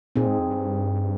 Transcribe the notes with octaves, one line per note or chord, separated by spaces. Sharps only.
A#2 C4 D#4 G#4
G#2
F2
G2